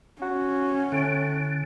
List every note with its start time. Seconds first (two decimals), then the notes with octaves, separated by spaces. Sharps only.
0.22 C#4 F#4
0.92 A2 D3